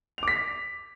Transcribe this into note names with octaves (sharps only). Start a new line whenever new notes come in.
D6 B6 F7